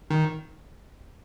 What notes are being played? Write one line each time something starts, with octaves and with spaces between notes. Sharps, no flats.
D#3